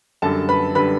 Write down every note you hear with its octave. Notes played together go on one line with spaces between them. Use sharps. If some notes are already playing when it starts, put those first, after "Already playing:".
F#2 D3 G3 A4 A5
B4 B5
D3 G3 B4 B5